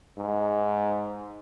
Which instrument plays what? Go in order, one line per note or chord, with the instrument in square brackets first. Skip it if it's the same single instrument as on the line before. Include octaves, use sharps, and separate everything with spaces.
[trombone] G#2